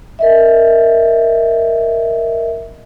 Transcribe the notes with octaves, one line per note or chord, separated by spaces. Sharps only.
A#4 D#5 E5